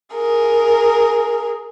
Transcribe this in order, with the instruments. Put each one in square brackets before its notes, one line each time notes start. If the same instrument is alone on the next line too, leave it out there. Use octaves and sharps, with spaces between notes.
[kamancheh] G#4 A#4